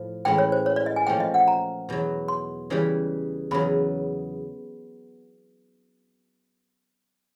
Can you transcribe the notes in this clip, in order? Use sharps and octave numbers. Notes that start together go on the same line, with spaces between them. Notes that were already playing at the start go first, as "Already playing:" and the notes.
Already playing: A2 F3
A2 E3 G#3 C#4 E4 G5
C#5
C5
C#5
D5
D#5
G#5
A#2 F3 A3 C#4 G5
D#5
F#5
A#5
E2 B2 F#3
C6
C#3 E3 G3
E2 C#3 F#3 B3 B5